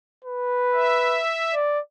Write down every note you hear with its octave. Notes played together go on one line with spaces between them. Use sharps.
B4
E5
D5